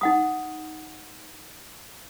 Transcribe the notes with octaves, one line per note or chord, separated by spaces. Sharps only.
D#4 F#5 D#6